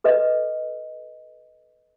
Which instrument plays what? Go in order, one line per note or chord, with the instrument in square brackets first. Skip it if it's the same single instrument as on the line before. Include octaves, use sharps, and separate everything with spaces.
[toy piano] A4 B4 D#5